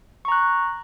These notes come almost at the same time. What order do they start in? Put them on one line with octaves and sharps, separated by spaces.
C#6 A#5 F#6